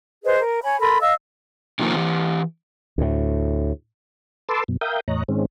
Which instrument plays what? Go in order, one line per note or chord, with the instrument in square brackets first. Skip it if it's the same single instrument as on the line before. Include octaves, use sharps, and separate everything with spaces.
[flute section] G#4 B4 C5 D#5
A#4
C#5 G#5 B5
A4 A#4 B5 C6
D#5 F5 E6
[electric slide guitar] C3 D#3 F3 A#3 C4
E3 G4
[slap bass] D2 A2
[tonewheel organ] A4 B4 A5 C6 D6 E6
F#2 B2
A#4 E5 F5 G5 D#6 G6
E2 A2 C#5 D#5 A#5 F#6
G#2 D#3 G#3 C4 C#4